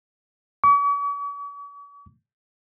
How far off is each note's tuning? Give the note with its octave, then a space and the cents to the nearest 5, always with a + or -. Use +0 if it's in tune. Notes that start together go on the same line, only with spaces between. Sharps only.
C#6 +45